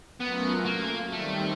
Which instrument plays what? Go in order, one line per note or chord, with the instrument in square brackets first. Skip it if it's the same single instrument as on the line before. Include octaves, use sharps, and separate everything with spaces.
[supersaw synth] F#3 A3 C#4 F4 A#4 [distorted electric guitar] B3
[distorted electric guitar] A#3
[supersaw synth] D#3 G3 C4 [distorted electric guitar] A3